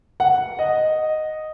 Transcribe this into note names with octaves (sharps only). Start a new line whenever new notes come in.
F#5
D#5